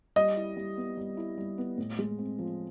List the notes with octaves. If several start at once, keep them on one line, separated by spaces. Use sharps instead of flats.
G3 D#5
E4
G3
B3
G3
E4
G3
B3
A2
G#3
C4
F3